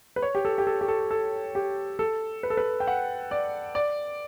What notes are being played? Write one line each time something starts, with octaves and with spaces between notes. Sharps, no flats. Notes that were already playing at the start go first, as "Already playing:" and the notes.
B4
C#5
G4
A4
G4
A4
G4
A4
A4
G4
A4
B4
A4
B4
G5
F#5
D5
D5